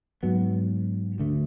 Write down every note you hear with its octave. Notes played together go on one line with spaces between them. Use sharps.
G#2 F#3 B3
D2 D3 A3